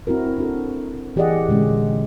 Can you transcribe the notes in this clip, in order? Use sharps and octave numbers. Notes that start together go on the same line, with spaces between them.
C4 E4 F#4 A#4
D4 F#4 A4
E3 G4 G#4 D5 D#5 F#5
A#2 D3 G#3 C#4